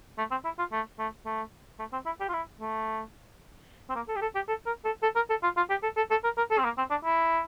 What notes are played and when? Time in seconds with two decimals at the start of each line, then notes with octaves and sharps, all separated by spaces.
0.18 A3
0.31 C4
0.44 E4
0.58 F4
0.72 A3
0.99 A3
1.25 A3
1.79 A3
1.93 C4
2.06 E4
2.20 G4
2.29 F4
2.33 E4
2.60 A3
3.90 C4
3.95 A#3
4.08 A4
4.16 G4
4.22 A4
4.35 G4
4.48 A4
4.66 A#4
4.85 A4
5.03 A4
5.15 A#4
5.30 A4
5.43 F4
5.57 F4
5.70 G4
5.83 A4
5.97 A4
6.10 A4
6.24 A#4
6.38 A#4
6.51 A4
6.59 C4
6.64 A#3
6.78 C4
6.91 D4
7.04 E4